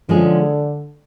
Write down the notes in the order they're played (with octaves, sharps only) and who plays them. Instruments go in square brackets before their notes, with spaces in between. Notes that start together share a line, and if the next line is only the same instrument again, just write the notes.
[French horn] D3 [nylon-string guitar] F3 G#3 C#4 G#4